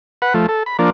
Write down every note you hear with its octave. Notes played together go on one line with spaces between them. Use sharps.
B4 F#5
F3 A3
A4
B5
F3 A#3 D4